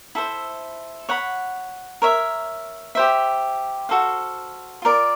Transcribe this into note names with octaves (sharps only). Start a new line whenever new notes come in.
E4 A4 C5
C#5 F#5 B5
A#4 C#5 E5
G4 C5 E5
F#4 A4 C5 F5
F4 A#4 D5